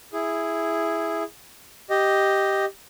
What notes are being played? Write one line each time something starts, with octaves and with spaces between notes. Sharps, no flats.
E4 G#4
G4 D#5